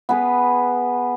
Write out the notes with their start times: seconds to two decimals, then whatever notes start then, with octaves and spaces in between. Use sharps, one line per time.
0.09 B3 G#4 B4